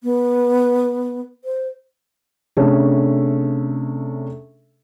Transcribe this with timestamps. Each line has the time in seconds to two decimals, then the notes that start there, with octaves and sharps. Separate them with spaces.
0.04 B3
1.44 C5
2.57 C3 A3 C#4 D4 G#4 A4